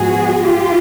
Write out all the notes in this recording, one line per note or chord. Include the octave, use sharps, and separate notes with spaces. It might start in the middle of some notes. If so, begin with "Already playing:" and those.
Already playing: G#2 F3 G#3 B3 F#4 G#4
F4 G4